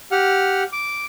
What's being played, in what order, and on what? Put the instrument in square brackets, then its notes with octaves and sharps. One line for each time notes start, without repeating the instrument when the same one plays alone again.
[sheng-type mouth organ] G4 F#5 F6
D6